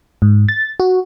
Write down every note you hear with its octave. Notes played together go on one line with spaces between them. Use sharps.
G#2
A6
F#4